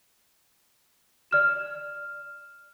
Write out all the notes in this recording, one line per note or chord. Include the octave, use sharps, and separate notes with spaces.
D5 F6 E7